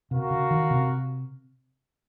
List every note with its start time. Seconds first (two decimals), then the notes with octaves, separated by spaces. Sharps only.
0.11 C3 F#4 A#4 F5
0.31 C#3
0.51 D#3
0.70 C3